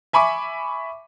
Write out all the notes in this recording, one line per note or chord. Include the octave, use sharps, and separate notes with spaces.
E5 G#5 B5 C#6 D6